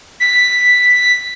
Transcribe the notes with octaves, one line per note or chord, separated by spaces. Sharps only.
B6